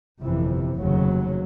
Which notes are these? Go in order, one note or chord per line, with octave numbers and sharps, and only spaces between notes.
G1 F2 C3 E3
F1 D#2 C#3 F#3